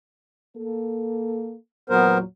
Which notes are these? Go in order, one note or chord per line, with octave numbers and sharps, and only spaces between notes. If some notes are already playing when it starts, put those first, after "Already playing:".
A#3 A4
E2 A#2 F#3 B3 A#4 C5